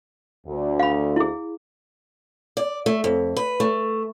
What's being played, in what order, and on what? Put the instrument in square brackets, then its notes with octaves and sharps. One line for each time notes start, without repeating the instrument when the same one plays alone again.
[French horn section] D2
[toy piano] F5 B5
E4 G#4
[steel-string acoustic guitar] D5
A3
F2
B4
A3